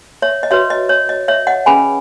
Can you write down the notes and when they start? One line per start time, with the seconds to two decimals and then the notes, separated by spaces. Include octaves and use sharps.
0.22 C#5 E5
0.43 D#5
0.51 F#4 B4 C#5 E5
0.70 D#5
0.89 C#5
1.09 D#5
1.28 C#5 E5
1.47 D#5 F#5
1.66 C#4 G#4 B4 G#5 B5